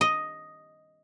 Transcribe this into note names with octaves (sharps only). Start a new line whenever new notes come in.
D#5